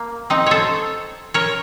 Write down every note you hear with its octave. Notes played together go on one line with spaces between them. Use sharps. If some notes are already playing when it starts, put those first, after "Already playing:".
Already playing: A#3
C4 D#4
A4 C5 C#5
A#4 C#5